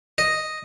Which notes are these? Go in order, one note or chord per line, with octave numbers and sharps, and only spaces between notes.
D#5